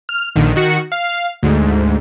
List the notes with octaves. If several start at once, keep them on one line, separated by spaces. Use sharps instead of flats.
F6
A#1 D3 D#3
D#3 F#4 C#7
F5
D2 G#2